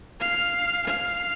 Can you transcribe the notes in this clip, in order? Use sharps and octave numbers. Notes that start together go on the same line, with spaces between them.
F5
F5